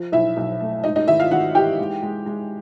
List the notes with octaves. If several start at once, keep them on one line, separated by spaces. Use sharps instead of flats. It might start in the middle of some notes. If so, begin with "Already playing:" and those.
Already playing: F3
B1 E4 E5
B1
A3
G#2 D#4 D#5
D#4 D#5
G#1 E4 E5
F4 F5
G#1 F#4 F#5
E3 G4 G5
G#3
G#3
G#3